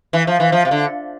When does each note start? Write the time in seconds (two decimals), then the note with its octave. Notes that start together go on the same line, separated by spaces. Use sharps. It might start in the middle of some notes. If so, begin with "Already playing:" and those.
0.13 E3
0.27 F3
0.40 E3
0.52 F3
0.65 C3
0.71 D3